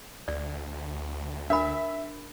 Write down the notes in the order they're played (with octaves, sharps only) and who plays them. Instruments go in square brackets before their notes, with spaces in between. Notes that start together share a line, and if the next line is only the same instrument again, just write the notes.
[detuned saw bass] D2 [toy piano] D5
[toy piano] D4 A#4 B5 [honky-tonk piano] E5